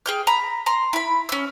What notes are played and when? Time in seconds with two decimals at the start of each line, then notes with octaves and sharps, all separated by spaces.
0.06 G#4 G5 F6
0.27 A#5 B5
0.66 A#5 C6
0.93 E4 B5
1.29 C#4 E6